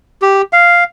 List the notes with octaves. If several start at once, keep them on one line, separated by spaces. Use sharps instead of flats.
G4
F5